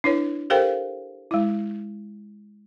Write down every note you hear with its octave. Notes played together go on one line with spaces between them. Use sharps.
D4 E4 B4 C#5
G4 A4 A#4 C5 F5 G5
G#3 E4